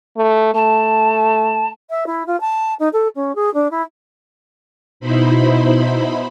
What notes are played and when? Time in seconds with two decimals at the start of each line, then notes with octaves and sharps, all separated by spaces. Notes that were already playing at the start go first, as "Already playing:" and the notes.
0.17 A3
0.54 A3 A5
1.90 E5
2.06 E4
2.26 F4
2.40 A5
2.79 D#4
2.93 A4
3.15 C#4
3.35 G#4
3.54 D4
3.71 E4
5.00 B2 D#4 E4 C5 B5